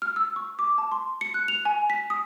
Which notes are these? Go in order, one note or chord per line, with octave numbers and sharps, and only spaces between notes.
F6
E6
C#6
D6
A5
C6
C#7
F#6
F7
G#5
B6
D#6